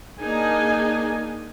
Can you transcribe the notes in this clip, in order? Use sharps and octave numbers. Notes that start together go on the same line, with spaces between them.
A#3 D4 D#4 G#4 G#5